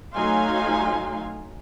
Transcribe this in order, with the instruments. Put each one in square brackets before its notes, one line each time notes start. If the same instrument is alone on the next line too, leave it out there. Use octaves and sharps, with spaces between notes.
[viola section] F#3 A3 D#4 F5 G#5 C6